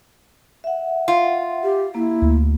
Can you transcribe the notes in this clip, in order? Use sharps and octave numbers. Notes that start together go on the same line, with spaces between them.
E5 F#5
F4
G4
A#3 E4
D2